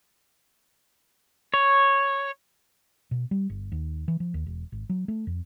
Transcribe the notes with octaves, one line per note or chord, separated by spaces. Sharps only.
C#5
B2
G3
G1
D#2
E3
F3
D#2
E1
G#1
F#3
A3
F2